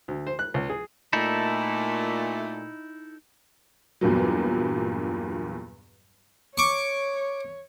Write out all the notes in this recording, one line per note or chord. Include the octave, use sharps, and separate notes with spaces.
D2
C5
F#6
C#2
G#4
A#2 A3 D#4 E4 A4
E2 G2 A#2 F#3
C#5 C#6 D6